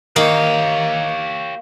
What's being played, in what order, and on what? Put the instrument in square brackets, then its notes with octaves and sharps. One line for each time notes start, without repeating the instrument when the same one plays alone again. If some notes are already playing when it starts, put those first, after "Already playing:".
[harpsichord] D#3 [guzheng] A#3 [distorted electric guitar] G4 C#5